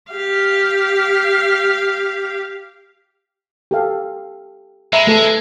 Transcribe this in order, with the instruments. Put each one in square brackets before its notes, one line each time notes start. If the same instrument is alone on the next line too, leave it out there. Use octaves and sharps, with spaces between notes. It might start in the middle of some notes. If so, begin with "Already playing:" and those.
[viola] G4 F5
[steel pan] G4 A4 F5
[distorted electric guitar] G#3 [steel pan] E5 A#5 B5
[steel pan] A3 A4 B4